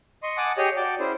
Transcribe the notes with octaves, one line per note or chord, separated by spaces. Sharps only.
D#5 C6 C#6
F#5 G#5 A5 D6 D#6
G4 G#4 C#5 D#5
F#4 D5 G5 A5
C#4 E4 G#4 C5